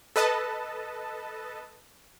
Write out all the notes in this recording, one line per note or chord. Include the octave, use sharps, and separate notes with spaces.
A4 B4 D#5 A5